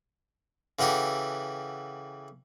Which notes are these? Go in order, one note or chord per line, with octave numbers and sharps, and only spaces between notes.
C#3 E3 F#4 G4 A4